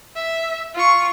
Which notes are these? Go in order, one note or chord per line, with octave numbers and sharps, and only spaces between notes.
E5
F4 C#6